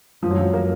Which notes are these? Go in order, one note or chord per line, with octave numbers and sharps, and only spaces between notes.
F#2 F3
F#3
F3
A#3